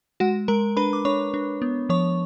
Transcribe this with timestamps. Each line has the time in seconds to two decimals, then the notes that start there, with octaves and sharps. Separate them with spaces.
0.20 G#3 F#4 F#5
0.48 G#3 A#4 A#5
0.77 D4 B4 B5
0.93 D6
1.05 D4 C#5 C#6
1.34 D4
1.62 B3
1.89 F3 C#5 C#6